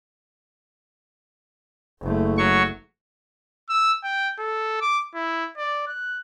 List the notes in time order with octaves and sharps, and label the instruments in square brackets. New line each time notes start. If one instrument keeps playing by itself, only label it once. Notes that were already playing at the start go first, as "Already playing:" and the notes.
[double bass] F#1 A3
[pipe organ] F#3 C#6
[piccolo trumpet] E6
G5
A4
D6
E4
D5
F#6